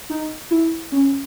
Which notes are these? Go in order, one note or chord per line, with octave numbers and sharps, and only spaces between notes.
D#4
E4
C#4